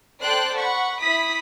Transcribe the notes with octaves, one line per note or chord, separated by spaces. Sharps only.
A4 C5 D5 G5 C6 F#6
F#5 B5 C#6
E4 B5 D#6 B6